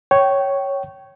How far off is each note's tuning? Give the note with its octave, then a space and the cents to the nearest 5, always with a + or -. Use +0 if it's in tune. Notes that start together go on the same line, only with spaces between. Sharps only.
C#5 +0 G5 -20